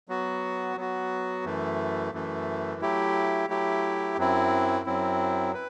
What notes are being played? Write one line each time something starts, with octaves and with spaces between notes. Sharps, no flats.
F#3 B3 F#4
F#3 B3 F#4
F#2 E3 A3
F#2 E3 A3
F#3 A3 E4 G4
F#3 A3 E4 G4
F#2 F#3 C4 E4
F#2 F#3 C4 E4
B4